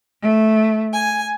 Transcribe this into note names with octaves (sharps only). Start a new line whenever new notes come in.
A3
G#5